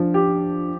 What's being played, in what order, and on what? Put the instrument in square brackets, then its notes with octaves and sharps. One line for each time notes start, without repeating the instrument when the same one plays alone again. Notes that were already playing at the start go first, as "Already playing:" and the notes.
Already playing: [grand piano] F3 [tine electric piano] D4
[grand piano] G4